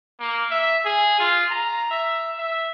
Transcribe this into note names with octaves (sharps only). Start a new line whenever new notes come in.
A#3
E5
G#4
F4
A#5
E5
E5